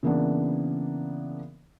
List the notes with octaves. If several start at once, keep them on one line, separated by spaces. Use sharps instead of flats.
C#3 E3 A#3 B3 D4